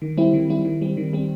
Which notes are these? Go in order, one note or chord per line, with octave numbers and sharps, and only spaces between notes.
D#3
G3 C4 E4
D#3
G3 C4 E4
D#3
G3 C4
D#3
G3 C4